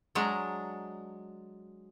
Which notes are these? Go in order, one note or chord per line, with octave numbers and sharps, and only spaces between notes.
F#3 G#3 D4 A#5